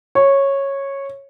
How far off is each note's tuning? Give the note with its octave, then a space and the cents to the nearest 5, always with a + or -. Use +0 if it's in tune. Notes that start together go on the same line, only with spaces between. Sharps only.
C#5 -10